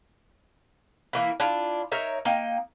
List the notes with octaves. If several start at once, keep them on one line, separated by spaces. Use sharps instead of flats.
E3 A#3 E4
D4 E4 F4
D#4 A#4 C#5 E5
A#3 D#4 G5